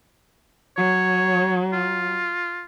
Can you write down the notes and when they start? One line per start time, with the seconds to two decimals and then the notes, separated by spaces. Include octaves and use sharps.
0.77 F#3 C#5
1.73 F4